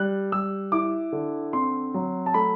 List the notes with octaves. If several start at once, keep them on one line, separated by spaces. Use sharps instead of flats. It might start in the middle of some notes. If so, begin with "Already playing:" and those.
Already playing: G3 F#6
G3 E6
E4 D6
D3
C4 C6
F#3
A5
A3 B5